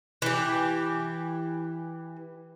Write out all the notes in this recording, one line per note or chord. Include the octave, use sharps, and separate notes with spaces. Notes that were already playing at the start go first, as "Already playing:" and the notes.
E3 G4